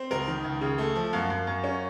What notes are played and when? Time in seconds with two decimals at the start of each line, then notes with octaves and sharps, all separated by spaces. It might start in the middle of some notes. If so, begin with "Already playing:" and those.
Already playing: C4
0.11 C#2 A#4
0.28 D#3
0.44 C#2
0.61 C#3
0.78 A3
0.95 F3
1.13 F#2 F5
1.30 F#2
1.47 F#2
1.64 C#4